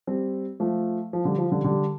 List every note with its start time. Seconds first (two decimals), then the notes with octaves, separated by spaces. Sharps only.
0.07 G3 C4
0.60 F3 A3
1.13 F3
1.25 D3 G3
1.38 F3
1.51 D3 G3
1.64 D3 G3